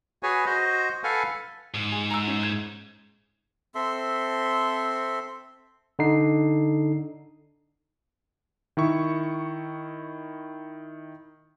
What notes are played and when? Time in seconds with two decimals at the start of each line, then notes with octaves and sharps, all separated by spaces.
0.23 F#4 G#4 B4 C#5 G#5
0.46 F#4 C5 D#5
1.04 A4 B4 F5 F#5 G#5
1.74 G#2
1.92 G#4
2.10 A#5 E6
2.28 C#4
2.43 G#6
3.75 C4 A4 E5 C6
5.99 D3 D#4 C7
8.77 D#3 E4 C#6